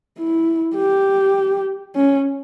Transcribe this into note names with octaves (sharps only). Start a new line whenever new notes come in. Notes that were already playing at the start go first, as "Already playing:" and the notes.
E4
G4
C#4